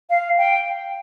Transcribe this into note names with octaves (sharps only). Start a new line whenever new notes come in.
F5
G5